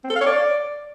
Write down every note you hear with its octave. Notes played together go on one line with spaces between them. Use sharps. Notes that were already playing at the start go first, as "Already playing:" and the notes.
C4
A4
F5
C#5
D5